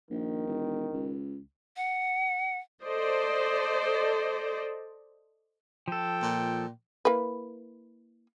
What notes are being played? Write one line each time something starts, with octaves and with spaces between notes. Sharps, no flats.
A#1 D#3
E1
C#2
F#5
A4 C5 D5 D#5
F3 A4 G5
A#2
A#3 E4 B4